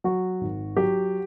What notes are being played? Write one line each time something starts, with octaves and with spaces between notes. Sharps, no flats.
F#3 F#4
G#1
F#3 G4